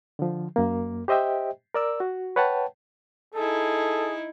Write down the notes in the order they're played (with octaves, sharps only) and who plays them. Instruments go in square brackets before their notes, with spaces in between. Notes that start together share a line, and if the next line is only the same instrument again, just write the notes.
[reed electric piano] D3 F3
F#2 A#3
G4 C5 D#5 E5 G5
A#4 D5 E6
F#4
B4 C#5 F#5 G5 A5
[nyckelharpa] D#4 E4 [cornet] G#4 [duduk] A4